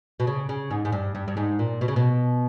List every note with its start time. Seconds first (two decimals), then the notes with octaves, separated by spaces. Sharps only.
0.20 B2
0.27 C#3
0.49 C#3
0.71 G#2
0.85 G#2
0.92 G2
1.15 G2
1.28 G2
1.37 G#2
1.59 A#2
1.81 B2
1.88 C#3
1.96 B2